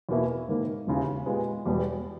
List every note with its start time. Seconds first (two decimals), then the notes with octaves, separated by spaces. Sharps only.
0.09 E2 B2 A#3 E4
0.48 G#2 D#3 A#3
0.87 E1 D#2 C#3 E3
1.26 A#2 G#3 B3 G4
1.65 E1 E2 B2 G3